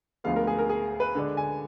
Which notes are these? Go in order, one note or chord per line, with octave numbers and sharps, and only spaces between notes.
D2 D3 F3 G#3 B3 F5
A#4
G#4
A#4
G#4
B4
D3 G#3 D4
G#5